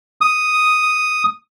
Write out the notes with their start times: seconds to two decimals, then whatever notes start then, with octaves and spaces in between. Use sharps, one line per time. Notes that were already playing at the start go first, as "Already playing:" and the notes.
0.21 D#6